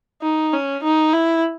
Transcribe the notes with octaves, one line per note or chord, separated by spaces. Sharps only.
D#4
C#4
D#4
E4